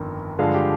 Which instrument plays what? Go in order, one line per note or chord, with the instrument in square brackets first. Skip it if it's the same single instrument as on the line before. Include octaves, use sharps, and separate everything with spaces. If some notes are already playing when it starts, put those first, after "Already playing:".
Already playing: [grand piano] G1 F2 D#3
G2 D3 F3 G#3 F5
G4